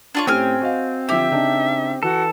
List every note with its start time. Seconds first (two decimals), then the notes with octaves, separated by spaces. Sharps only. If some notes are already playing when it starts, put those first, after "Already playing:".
0.15 D4 F4 C#5
0.27 A2 C4 C#4 G4 G5 G#5 F6
0.61 F#4 D#5 F5
1.09 D3 F3 G4 E5
1.31 C#3 D4 D#4
2.03 E3 F#4 A4